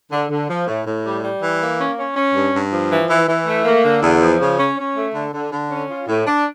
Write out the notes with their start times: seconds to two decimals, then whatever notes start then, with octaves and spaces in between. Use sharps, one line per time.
0.11 D3
0.29 D3
0.49 F3
0.67 A2
0.86 A2
1.04 G3
1.23 G3
1.42 E3
1.60 A#3
1.79 C#4
1.97 C#4
2.16 C#4
2.35 G2
2.54 G2
2.72 F3
2.91 E3
3.10 E3
3.28 E3
3.46 A3
3.65 A#3
3.84 D3
4.03 E2
4.21 F3
4.40 C#3
4.58 C#4
4.77 C#4
4.95 A3
5.14 D3
5.33 D3
5.52 D3
5.71 C#4
5.89 F4
6.07 A2
6.27 D4